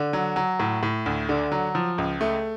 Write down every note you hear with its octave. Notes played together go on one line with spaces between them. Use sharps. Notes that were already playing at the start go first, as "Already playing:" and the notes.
Already playing: D3
F#3
F#3
A2
A2
D2
D3
F#3
F3
C#2
A3